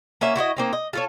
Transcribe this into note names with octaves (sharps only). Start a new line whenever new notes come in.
A#3 C#4 F#4 E5
E4 F#4 C5 D#5
A#3 C4 D#4
D#5
F4 A4 C#5